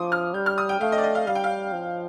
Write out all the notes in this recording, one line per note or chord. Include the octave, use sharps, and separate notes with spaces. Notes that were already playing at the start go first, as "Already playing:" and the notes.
Already playing: F3 C6 D6 D#6
F6
G3 G6
F6
D#6
G5
A3 F5
D#5
D5
D#5
F5
G3 F5
G5
F5
F3